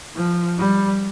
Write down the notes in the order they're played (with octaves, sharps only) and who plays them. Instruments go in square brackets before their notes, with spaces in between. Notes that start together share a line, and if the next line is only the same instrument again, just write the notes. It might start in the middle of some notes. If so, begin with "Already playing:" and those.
[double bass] F3
G3